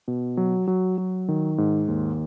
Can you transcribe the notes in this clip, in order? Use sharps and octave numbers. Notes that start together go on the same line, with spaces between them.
B2
F#3
F#3
F#3
D#3
G#2
D#2